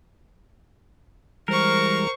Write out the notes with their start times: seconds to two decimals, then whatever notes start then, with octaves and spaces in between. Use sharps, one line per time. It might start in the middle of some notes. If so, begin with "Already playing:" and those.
1.48 E3 G3 G#3 A#4 C5 C#6